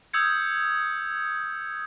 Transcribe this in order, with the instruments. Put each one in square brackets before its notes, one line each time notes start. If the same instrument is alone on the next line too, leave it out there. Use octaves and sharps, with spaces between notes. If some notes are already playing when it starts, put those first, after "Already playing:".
[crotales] D#6 E6 G6 G#6 C#7